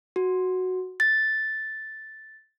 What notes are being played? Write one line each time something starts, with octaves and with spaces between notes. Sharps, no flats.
F#4
A6